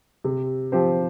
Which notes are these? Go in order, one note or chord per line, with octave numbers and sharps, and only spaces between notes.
C3
F3 C4 G4 C5